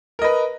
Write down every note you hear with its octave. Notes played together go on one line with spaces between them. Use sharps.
A#4 B4 D#5